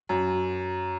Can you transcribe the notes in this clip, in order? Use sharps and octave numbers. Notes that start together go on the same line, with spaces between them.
F#2